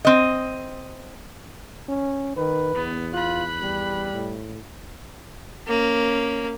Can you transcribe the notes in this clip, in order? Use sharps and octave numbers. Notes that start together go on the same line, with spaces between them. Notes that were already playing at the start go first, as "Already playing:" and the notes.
C4 D#5
C#4
D#3 B4
E2 B3
F4 B5 F#6
G3
A2
A#3 C#4